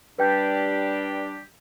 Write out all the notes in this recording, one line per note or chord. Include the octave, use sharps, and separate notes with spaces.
G3 D4 G4 B4 G5 G6